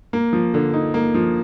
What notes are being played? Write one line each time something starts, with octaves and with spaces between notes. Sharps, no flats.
A#3
F3
D3
D#4
A#3
F3